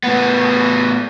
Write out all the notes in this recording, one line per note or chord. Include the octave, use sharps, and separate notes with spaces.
A2 B3